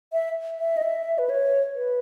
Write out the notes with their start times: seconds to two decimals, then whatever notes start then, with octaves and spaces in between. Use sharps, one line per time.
0.13 E5
0.59 E5
0.77 D#5
0.82 E5
1.18 B4
1.30 C#5
1.76 B4